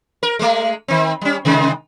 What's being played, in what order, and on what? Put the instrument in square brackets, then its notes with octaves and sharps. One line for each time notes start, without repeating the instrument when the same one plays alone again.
[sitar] A#4
G#3 A3
D#3 C4
G3 C#4
C3 D#3 G#3